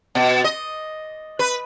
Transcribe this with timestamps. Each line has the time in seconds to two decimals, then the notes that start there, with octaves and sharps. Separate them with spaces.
0.15 B2
0.44 D#5
1.39 B4